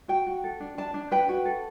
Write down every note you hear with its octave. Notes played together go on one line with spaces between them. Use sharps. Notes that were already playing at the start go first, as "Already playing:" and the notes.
F#4 G5
F#4
A4
D4
D4 A5
D4
B4 G5
F#4
A4